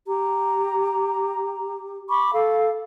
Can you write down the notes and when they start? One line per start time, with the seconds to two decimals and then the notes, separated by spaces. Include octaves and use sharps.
0.07 G4 A#5
2.09 B5 C#6 D6
2.32 A4 F5